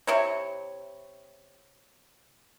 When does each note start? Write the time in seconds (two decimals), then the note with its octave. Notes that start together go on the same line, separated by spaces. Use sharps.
0.07 C3 E4 C#5